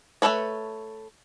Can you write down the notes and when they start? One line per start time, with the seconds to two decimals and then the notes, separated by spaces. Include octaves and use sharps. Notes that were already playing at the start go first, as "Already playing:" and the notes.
0.22 A3 D4 A4 B4 C#5